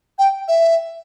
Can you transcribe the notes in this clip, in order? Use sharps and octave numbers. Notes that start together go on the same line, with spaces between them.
G5
E5